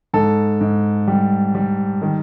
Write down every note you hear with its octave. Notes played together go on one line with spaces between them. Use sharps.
G#2 A4
G#2
G3
G3
D#3